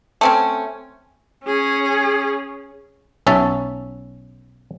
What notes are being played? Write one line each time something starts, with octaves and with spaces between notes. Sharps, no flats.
A3 C4 C#4
C#4 G#4
B1 C#4 E5 A5